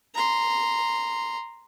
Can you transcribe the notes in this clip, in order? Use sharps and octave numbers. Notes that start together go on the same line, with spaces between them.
A#5 C6